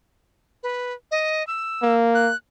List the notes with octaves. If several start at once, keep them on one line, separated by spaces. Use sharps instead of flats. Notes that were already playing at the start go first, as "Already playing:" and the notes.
B4
D#5
E6
A#3
F#6